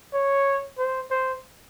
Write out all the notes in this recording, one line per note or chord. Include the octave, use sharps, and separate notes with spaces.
C#5
C5
C5